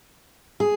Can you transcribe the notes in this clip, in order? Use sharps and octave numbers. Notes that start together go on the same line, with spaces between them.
G#4